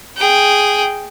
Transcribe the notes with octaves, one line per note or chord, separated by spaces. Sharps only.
G#4 G5